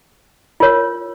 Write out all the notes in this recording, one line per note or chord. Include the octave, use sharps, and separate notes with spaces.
F4 A#4 C#5